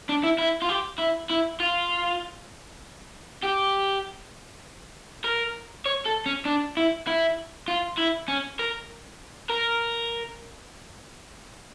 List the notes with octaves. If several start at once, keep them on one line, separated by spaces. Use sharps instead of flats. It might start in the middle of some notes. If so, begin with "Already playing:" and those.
D4
E4
E4
F4
G4
E4
E4
F4
G4
A#4
C#5
A4
C#4
D4
E4
E4
F4
E4
C#4
A#4
A#4